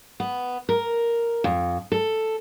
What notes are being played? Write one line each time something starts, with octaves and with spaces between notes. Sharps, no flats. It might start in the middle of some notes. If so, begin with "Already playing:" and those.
B3
A#4
F2
A4